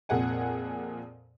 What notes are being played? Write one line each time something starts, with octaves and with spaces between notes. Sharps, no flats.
F2 A#2 G#4 F#5 G#5